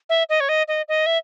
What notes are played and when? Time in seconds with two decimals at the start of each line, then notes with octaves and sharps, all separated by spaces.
0.09 E5
0.29 D#5
0.40 C#5
0.49 D#5
0.68 D#5
0.88 D#5
1.06 E5